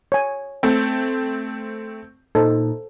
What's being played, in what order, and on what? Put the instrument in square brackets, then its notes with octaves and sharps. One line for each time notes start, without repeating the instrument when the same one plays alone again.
[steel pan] C#5 G#5
[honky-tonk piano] A3 C4
[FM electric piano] A#2 D#4 [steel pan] A4 C5